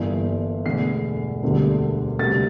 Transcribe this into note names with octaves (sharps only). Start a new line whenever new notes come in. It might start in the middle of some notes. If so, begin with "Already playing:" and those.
Already playing: G1 G2 E3 A#3
E1 E2 D3 A3 C7
E1 D2 D3 G3 A#3
D2 C3 G3 A#3 A6